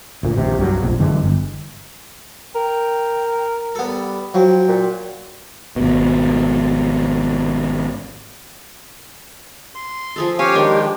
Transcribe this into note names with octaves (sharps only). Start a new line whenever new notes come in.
D2 A#2
A#1 D#2 C3
C2 G2 F#3
F1 A#1 F2
F#2 D3 E3 G#3
G1
A#4 G5
G3 B3 A4
F3 F#3 G5
A#2
G#1 B2
C6
F3 G#4 A4
C#4 G4 C#5 F5 G#5
D#3 G#3 D4